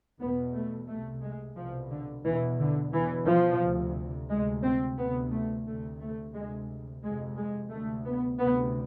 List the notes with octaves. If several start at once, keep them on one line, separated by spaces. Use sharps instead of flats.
E2 B2 B3
A3
C2 C3 A3
G#3
C2 B2 F3
D3
E2 B2 E3
D3
E2 B2 E3
F3
D2 C3
D2 C3 G#3
C4
D2 C3 B3
A3
D2 C3 A3
A3
D2 C3 G#3
F2 C3 G#3
G#3
D2 C3 A3
B3
D2 C3 B3